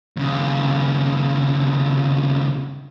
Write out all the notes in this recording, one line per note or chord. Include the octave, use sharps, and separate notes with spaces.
D#2 C#3